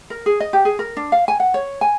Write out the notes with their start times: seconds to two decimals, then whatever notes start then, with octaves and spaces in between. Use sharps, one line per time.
0.10 A#4
0.26 G#4
0.40 D#5
0.53 G4
0.65 G#4
0.79 A#4
0.97 D4
1.12 F5
1.28 G#5
1.40 F#5
1.54 C#5
1.81 G#5